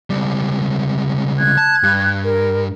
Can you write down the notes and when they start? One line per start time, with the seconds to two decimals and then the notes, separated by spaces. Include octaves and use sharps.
0.10 C#2 G3
1.38 F#6 G#6
1.58 A5
1.83 G2
2.22 A#4